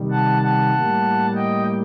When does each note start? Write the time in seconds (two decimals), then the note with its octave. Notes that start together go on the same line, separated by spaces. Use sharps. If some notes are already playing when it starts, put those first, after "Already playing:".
Already playing: C3 D#3 G3
0.11 F#5 A5
0.42 F#5 A5
0.73 A2 G3 A#3
1.35 D#5 G5